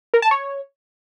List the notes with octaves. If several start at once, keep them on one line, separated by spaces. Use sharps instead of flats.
A#4
A5
C#5